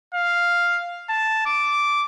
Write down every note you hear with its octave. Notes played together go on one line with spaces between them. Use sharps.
F5
A5
D6